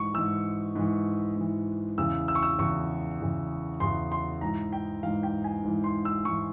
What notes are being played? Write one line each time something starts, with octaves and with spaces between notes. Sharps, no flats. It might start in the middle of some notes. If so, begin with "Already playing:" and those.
Already playing: G#2 E3 C#6
G#2 E3 E6
G#2 E3
G#2 E3
E2 C#3 E3 E6
E6
C#6
E6
E2 C#3 E3 C#6
E2 C#3 E3
E2 C#3 E3 C6
C6
G#2 E3 A#5
G5
G#2 E3 F5
G5
G#5
G#2 E3
C6
E6
G#2 E3 C#6